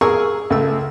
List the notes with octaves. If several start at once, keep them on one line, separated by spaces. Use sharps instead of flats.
G#4 A#4 G#5 C#6 E6
C#2 A3 E6